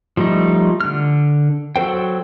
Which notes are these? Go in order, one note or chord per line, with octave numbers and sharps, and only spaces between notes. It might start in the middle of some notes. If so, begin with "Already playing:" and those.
F3 G3 A3 D#4
D3 F6
F#3 A4 C5 G5